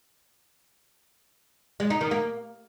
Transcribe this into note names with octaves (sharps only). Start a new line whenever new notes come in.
G#3
D#4
D#3
A#3